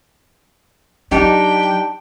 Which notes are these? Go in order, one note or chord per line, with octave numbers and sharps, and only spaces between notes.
F#3 D4 D#4 G4 G5